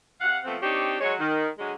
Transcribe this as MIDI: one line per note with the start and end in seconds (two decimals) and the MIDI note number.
0.21 0.39 48
0.21 0.39 77
0.21 0.39 78
0.45 0.56 53
0.45 0.56 57
0.45 0.56 59
0.45 0.56 60
0.62 0.96 60
0.62 0.96 62
0.62 0.96 63
0.62 0.96 67
0.62 0.96 73
1.01 1.14 54
1.01 1.14 56
1.01 1.14 73
1.20 1.48 51
1.59 1.73 50
1.59 1.73 54
1.59 1.73 56